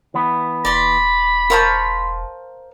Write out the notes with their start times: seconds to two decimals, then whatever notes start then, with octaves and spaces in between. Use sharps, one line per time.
0.14 E3 B3
0.65 E1 D5 B5 C6
1.50 E4 A#4 C5 F5 A5 C#6